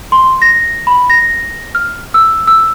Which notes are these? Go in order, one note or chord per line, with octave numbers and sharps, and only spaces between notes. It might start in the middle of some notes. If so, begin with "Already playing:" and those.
C6
A#6
B5
A#6
F6
E6
E6